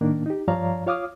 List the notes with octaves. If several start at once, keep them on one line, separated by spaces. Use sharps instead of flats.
A2 D#3 A#3 D4
D#4 G4
G2 F3 C#5 D5 F5 A#5
F4 C#5 F5 D6 D#6 F6